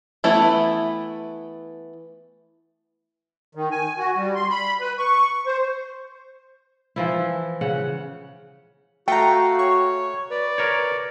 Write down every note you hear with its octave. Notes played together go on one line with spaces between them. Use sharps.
E3 A3 B3 E4
D#3
G#5
F#4
G3
C6
B5
B4
C#6
C5
E3 F3 E4
C#3 F#5
A3 F#4 F5 G5 A#5
C#5 C#6
B4 D5
A#4 C#5